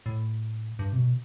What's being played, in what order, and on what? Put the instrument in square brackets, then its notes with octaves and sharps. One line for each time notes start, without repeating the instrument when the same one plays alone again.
[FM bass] A2
G2
C3
B2